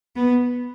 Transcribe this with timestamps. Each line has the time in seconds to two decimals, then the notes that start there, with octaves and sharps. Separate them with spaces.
0.16 B3